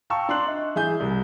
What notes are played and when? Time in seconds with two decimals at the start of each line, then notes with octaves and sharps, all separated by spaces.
0.10 F5 G5 A5 A#5 C#6 E6
0.29 D4 C6 F#6 F#7
0.45 D#5 E5
0.75 E3 G#4 E5 G#5 G6
1.00 C2